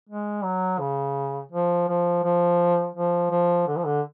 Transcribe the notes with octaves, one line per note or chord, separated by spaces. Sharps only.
G#3
F#3
C#3
F3
F3
F3
F3
F3
D3
F3
D3